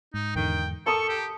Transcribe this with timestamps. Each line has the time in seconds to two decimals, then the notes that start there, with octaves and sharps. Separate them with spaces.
0.14 G#2 D#4
0.36 E2 G#2 D3 D#3 G5
0.86 A4 A#4 A5 C#6 D#6
1.08 G4